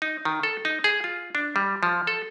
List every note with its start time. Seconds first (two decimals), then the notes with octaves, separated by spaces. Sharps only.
0.02 D#4
0.25 D#3
0.43 A4
0.65 D#4
0.84 G#4
1.04 F4
1.35 D4
1.56 G3
1.83 F3
2.07 A4